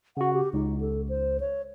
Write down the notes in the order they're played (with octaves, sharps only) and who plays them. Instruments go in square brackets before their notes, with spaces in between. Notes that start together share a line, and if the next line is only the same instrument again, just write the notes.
[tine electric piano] C#3 F#4 [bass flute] F#5
[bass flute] G4
[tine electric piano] C#2 [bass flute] D#4
[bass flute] A4
C5
C#5